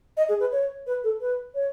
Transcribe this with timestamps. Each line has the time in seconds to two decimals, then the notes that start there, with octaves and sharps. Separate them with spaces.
0.17 D#5
0.29 G#4
0.40 B4
0.52 C#5
0.87 B4
1.04 A4
1.20 B4
1.55 C#5